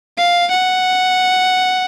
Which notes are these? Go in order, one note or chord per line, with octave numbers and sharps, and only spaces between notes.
F5
F#5